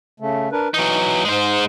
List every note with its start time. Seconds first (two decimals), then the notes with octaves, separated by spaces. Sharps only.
0.20 C#3 A3
0.52 D4 A#4 B4
0.74 E3 F#3 D#4
1.25 G#2 G#3 C5